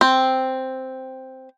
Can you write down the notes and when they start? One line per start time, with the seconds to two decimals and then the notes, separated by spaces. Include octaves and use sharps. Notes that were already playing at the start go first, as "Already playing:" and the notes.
0.01 C4